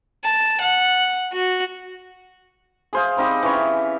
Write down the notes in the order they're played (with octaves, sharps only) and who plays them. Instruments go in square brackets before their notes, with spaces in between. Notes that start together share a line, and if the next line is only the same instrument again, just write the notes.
[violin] A5
F#5
F#4
[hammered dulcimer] G#4 C5 F5
G3 C4 D#4 G4
E3 C#4 C#5